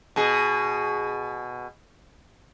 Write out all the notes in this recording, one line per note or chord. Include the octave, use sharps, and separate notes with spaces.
B2 G#4